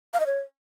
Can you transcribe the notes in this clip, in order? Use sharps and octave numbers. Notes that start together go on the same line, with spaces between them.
F5
D#5
C#5